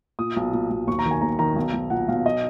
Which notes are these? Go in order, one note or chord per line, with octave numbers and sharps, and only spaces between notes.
A#2 D#6
B1
A#2
B1
D#2 C#6
A#5
D#3
G#5
D#2 A#5
D#3 A#5
B1
B1
A#2 F#5
B1 F5
D#5